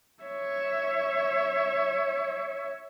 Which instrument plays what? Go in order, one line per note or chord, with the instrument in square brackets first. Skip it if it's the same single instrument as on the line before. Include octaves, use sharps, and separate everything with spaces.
[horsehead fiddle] C#5 E5